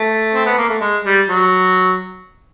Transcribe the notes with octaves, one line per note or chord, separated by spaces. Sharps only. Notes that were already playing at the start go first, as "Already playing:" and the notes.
Already playing: A3
C4
B3
A#3
A3
G#3
G3
F#3